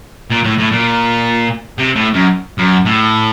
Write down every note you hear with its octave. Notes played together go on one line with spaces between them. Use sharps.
A#2
A2
A2
A#2
C3
A2
F#2
F#2
A2